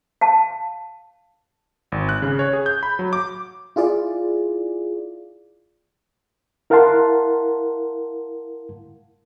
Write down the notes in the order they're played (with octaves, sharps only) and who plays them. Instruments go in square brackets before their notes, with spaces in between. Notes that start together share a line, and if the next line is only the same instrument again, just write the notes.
[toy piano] F5 A5
[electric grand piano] G#1
F#6
C#3
C#5
G#4
G6
B5
F#3
D6
[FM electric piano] E4 F4 G#4 D5
[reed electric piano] E4 A#4 F5 F#5 A5 C6